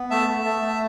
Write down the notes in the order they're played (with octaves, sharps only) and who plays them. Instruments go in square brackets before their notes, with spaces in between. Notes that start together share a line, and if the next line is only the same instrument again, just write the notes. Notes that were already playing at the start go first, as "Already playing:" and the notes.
Already playing: [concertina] B3
A3 E5 A5
A3
A3
A3
A5